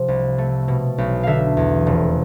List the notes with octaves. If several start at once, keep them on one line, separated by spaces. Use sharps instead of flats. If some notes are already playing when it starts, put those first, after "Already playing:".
Already playing: C3 F3
C2
A3
B2
B1
D3 E5 F5
E2
F1